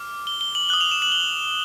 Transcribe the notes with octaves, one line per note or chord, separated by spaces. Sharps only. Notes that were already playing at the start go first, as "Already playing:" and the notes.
Already playing: D6 F6
G7
G7
F#7
D#6 F#6 F#7
F7
E7
F#7
G7